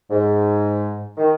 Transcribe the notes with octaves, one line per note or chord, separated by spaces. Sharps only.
G#2
D#3